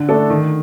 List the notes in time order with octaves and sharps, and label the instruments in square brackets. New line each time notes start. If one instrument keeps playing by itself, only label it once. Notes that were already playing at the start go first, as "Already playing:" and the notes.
Already playing: [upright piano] D3
A3 D4 A4
D#3